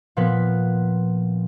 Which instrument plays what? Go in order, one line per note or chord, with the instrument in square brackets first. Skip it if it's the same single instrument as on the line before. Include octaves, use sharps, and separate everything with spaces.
[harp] A#2 F3 B3 B4